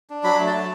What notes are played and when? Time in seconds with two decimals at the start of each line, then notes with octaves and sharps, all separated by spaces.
0.10 D4
0.24 F#3 B5
0.40 A3
0.47 A5
0.54 A3